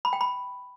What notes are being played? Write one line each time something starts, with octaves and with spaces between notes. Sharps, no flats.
B5
G5
B5